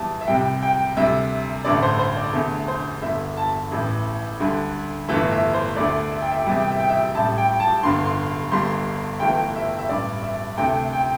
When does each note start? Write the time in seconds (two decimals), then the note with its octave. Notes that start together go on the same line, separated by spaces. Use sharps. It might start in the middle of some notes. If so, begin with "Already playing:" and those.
Already playing: E2 E3 G3 A5
0.21 E5
0.27 C2 C3 G3 G5
0.62 G5
0.96 D2 C3 G3 E5
1.65 A1 G2 D3 A3 D5
1.82 C5
1.99 C5
2.17 D5
2.33 E1 E2 D3 A3
2.68 C5
3.02 G1 G2 D3 E5
3.37 A5
3.72 A1 A2 E3
4.40 D2 D3 G3
5.09 G1 G2 E3 A3 E5
5.32 E5
5.54 C5
5.77 D2 D3 A3 D5
6.11 E5
6.22 G5
6.31 E5
6.41 G5
6.46 E2 C3 E3 G3 E5
6.60 G5
6.70 E5
6.80 G5
6.89 E5
7.15 A1 A2 G3 A5
7.38 G5
7.60 A5
7.83 G1 G2 D3 C6
8.05 C6
8.51 G1 G2 G3 C6
9.20 G1 G2 E3 A3 G5
9.55 E5
9.78 E5
9.89 A1 G2 G3 D5
10.23 E5
10.57 D2 C3 A3 G5
10.93 G5